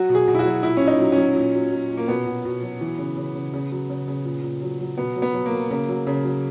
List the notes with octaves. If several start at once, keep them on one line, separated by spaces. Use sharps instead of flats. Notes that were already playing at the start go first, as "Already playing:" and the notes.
Already playing: F#3 F#4
B2
G#4
B2
E4
F#4
F#3
A#2 E4
A#2 C#4
D#4
F#3
F#3 C#4
A#2
F#3
A#2
A#2
A#3
B2 B3
B2
B2
F#3
E3
C#3
C#3
C#3
C#3
F#3
C#3
C#3
A#2
A#2
F#3
F#3
B2 B3
F#3
B3
F#3
A#3
F#3
C#3 A#3
F#3
C#3
F#3